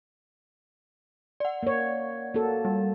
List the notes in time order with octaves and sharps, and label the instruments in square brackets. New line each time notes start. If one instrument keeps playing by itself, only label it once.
[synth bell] D5 F#5
[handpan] A#3 C#5
A#3 F#4 A4
[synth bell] G3